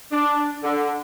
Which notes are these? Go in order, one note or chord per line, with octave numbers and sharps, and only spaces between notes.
D4
D3